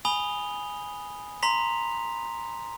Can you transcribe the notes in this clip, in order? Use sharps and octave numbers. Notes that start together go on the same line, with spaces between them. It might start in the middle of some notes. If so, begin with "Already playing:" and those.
G#5 B5 D#6 F7 G7
A#5 C6 B6 F7